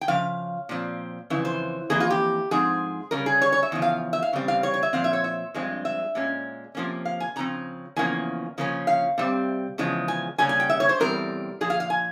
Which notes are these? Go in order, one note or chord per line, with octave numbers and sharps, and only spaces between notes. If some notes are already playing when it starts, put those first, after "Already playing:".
G5
C#3 F3 F5
A#2 F3 C4
F2 C#3 E3
C5
F2 E3 A#3 G#4
F4
G4
G#2 F3 C4 G#4
C#3 G3 C#4 A#4
G#4
C#5
C#5
E5
E2 C#3 F3
F5
E5
F5
E2 C#3 G3 C4
F5
C#5
C#5
E5
A#2 F3 C4 F5
E5
C#5
E5
G2 F3 G#3 C4
E5
A#2 G#3 C#4
C3 F3 A#3 C#4
F5
G#5
C#3 F3 C4 A#5
E2 C#3 F3 A#3 C#4 G#5
C#3 F3 A#3 C#4
F5
C3 G3 C4
E2 C#3 F3 G#3
G#5
C#3 G3 A#3 C#4 G#5
G#5
G5
E5
C#5
C5
E2 C3 G3 C4 A#4
A#2 F3 G#4
F5
F5
G#5